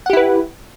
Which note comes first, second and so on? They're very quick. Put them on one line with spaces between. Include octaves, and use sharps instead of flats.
F#5 G4 E4 B4